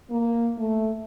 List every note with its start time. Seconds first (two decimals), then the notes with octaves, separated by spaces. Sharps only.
0.11 A#3
0.57 A3